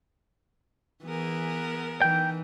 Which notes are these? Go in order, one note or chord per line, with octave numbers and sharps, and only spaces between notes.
E3 B3 G#4 A#4
E3 D#4 G5